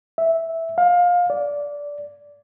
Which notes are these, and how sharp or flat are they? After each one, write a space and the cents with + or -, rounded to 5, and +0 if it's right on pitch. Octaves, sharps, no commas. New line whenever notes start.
E5 -5
F5 +20
D5 -15